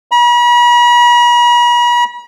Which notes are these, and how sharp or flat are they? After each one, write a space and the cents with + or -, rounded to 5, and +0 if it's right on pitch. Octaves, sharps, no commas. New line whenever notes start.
B5 -45